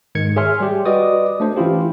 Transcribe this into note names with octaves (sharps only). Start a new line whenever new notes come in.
G#2 D#3 G#6 C#7
G#4 C#5 E5 G#5 C6 F6
G3 G4
F#4 B4 D5 D#5 D6 D#6
A3 D4 C5
E3 C#4 E4 F4 G4